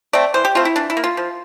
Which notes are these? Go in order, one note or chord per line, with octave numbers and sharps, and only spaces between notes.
A3 C4 D5
E3 C5
G4
A3 C4 F4
E4
E3 D4
E4
A#3
F4
F3